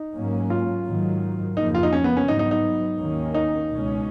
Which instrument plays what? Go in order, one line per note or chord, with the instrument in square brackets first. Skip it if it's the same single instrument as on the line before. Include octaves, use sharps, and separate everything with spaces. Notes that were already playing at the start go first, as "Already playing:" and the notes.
Already playing: [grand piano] D#4
[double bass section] G#2 F#3 A#3 C#4
[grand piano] F4
[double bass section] G#2 D#3 F#3
[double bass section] F2 C#3 F3 A#3 [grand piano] D#4
[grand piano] F4
D#4
C#4
B3
C#4
[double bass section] G#2 F#3 B3 [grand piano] D#4
[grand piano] D#4
D#4
[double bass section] D#2 D#3 A#3 C#4
[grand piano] D#4
[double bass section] C#2 B2 G#3 C#4